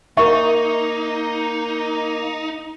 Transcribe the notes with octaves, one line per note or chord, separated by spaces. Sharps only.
A#3 D#4 A#4 E5 C#6